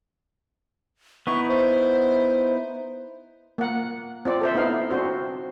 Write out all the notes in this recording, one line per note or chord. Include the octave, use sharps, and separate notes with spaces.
B3 D#4 E4 C#6
C5
A#3 F#5
C4 F4 D5
A4 C5 E5
B3 D#4 E4 F5
C4 D4 F#4 C5